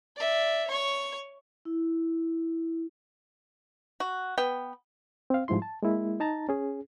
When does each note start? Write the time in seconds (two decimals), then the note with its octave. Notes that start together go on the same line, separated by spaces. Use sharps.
0.17 D5 E5
0.68 C#5 C#6
1.65 E4
4.00 F#4
4.38 B3 G5
5.30 C4 F5
5.48 G#2 F3 G3 E4 C6
5.62 A5
5.83 G#3 A#3 E4
6.20 D#4 A5 A#5 A6
6.49 C#4 G#4